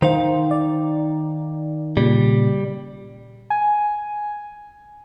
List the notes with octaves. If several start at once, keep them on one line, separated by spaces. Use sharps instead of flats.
D#3 D#4 C5 F5
D5
A#2 C#3 G3
G#5